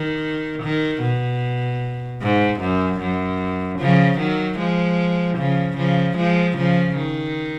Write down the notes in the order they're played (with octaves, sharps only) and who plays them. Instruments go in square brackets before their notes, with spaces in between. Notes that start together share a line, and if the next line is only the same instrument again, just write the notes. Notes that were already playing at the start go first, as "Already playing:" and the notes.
Already playing: [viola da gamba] D#3
D#3
B2
G#2
F#2
F#2
C#3 F3
D#3 F#3
F3 G#3
C#3 F3
C#3 F3
F3 G#3
C#3 F3
D#3